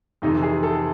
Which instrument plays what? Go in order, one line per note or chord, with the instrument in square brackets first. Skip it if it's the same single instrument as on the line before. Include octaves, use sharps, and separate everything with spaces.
[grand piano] F2 C3 E3 [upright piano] D#4
[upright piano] G#4
A4